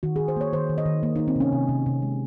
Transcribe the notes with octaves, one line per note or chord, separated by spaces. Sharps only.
D#3 F#4
G#4
D#3
C5
A#3 C#5
D#3 C5
D#3
D#5
D#3
A#3
A#3 D#4
C4
C3 C#4
C3
C3
C3
G#3